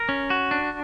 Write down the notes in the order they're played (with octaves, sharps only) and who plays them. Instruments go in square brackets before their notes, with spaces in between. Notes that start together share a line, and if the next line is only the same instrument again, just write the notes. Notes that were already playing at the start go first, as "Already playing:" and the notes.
Already playing: [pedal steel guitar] A#4
C#4
F#4
D4